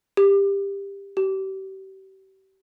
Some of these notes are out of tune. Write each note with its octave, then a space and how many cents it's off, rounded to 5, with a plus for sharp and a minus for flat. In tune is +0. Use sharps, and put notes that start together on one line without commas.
G4 +20
G4 -35